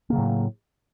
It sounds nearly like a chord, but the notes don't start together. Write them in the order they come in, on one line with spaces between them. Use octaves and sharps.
A#3 C#3 F#3 A2